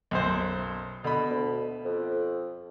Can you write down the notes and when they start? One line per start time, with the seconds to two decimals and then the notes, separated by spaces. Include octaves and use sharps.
0.11 B1 F#2 C5
1.04 B2 D3 B5
1.31 D2
1.85 F2